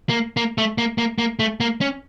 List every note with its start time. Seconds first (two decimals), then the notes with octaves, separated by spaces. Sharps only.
0.09 A#3
0.37 A#3
0.58 A3
0.78 A#3
0.98 A#3
1.18 A#3
1.39 A3
1.60 A#3
1.81 C#4